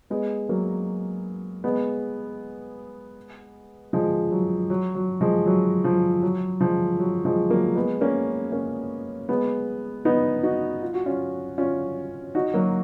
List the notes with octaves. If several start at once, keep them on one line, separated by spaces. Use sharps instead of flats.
G#3 B3
F#3 A#3
G#3 B3
F3 G#3
F#3
F#3
F#3
F3 G#3
F#3
F3
F#3
F3 G#3
F#3
F3 G#3
F#3 A#3
G#3 B3
A#3 C#4
A#3 C#4
G#3 B3
B3 D#4
D#4 F#4
F4
F#4
C#4 F4
C#4 F4
D#4 F#4
F#3 A#3